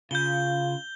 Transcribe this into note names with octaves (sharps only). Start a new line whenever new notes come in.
C#3 F4 G6 G7